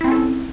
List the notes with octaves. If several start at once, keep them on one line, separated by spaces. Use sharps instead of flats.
C4 C#4 E4 A4